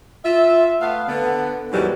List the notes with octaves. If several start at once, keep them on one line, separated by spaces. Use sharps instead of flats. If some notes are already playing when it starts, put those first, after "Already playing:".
F4 E5
A3 B3 F5
D3 B3
D#2 G#2 B2 E3 F#3 G3